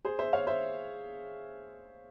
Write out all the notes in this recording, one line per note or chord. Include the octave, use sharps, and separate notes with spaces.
G#4 C5
C5 E5
C#5 F5
C5 E5